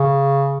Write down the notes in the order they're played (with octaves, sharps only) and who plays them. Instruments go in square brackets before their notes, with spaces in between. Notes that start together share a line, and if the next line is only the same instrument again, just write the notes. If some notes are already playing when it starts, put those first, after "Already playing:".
Already playing: [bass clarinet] C#3